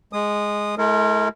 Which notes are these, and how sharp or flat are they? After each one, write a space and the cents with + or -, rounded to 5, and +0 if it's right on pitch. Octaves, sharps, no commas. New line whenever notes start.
G#3 +0 D#6 -20
G#3 +45 E4 -5 A#4 -30